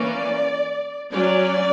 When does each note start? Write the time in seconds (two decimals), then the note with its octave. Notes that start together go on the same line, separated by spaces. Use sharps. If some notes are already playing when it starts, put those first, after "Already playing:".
Already playing: E3 A#3 C#4 D5
1.12 F#3 C#4 D5